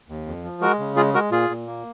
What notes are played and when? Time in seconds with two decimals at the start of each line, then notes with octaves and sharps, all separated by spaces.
0.08 D#2
0.26 F2
0.44 F3
0.61 G#3 F#4 A#4
0.79 C#3
0.96 G#3 F4 G#4
1.14 G#3 F#4 A#4
1.31 A#2 F4 G#4
1.49 A#2
1.67 A#3